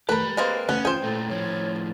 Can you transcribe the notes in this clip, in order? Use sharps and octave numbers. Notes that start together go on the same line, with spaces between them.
A3 G4 A#4 B4 B5
G#3 A#3 C4 B4
D2 B3 C#4
F4 G#4 C5 G5
A#2 A3 A4
A2 F3 C#5